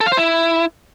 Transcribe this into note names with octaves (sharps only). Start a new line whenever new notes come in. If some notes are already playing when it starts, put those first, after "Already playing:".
A4
F5
C5
E4